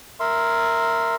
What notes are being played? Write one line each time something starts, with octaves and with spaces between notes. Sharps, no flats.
A#4 E5 C6